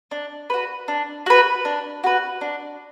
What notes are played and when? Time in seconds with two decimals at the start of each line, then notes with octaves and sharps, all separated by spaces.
0.11 D4
0.50 F#4 B4
0.88 D4
1.26 F#4 B4
1.65 D4
2.04 F#4 B4
2.41 D4